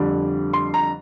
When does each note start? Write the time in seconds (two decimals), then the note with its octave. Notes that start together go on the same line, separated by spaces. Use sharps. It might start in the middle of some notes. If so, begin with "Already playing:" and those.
Already playing: F2 D3 G3
0.53 C6
0.74 A#5